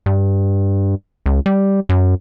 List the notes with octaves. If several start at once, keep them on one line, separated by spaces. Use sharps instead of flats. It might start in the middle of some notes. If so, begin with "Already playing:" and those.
G2
C#2
G3
F#2